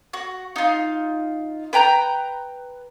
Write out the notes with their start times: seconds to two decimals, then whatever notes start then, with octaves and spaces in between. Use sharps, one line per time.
0.13 F#4
0.56 D#4 F4
1.73 B4 G5 A#5 G6